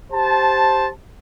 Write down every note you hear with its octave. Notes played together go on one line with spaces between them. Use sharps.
G4 C5 A5